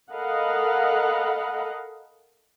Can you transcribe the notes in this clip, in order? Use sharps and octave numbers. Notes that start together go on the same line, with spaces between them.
A4 A#4 D#5 F5 F#5 B5